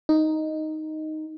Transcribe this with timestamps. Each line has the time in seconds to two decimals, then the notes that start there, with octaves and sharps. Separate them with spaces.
0.09 D#4